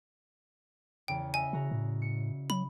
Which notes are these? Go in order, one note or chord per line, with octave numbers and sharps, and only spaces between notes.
E2 C#3 G5
D#5 E5 G#5
C#3 F#4 A#5
A2
C#7
F#3 B5